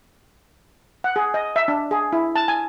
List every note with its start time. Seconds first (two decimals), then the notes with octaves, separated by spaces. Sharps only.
1.04 F#5
1.16 G#4
1.34 D#5
1.56 E5
1.68 D4
1.91 G#4
2.13 E4
2.36 A5
2.48 G#5